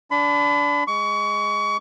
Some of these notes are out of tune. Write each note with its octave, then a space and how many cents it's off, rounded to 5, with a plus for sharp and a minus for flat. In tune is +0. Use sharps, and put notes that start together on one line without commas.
D4 -20 B5 +35
G#3 +0 C#6 +30